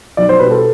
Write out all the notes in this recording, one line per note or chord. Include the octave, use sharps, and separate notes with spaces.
B1 D5
C5
B2 G3 B4
A4